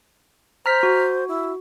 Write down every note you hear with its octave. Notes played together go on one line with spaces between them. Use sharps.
C5 A#5 F6 B6
F#4
E4